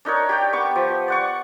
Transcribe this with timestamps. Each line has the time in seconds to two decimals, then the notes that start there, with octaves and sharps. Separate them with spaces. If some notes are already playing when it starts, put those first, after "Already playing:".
0.05 D4 D#4 A#4 C#5
0.29 G4 D5 G5
0.53 B3 C#6 D6
0.75 F3
1.08 D5 F#5 C#6